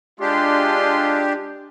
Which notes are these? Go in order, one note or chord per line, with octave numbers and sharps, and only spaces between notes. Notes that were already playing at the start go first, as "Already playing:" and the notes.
G#3 D4 F4 G4 C6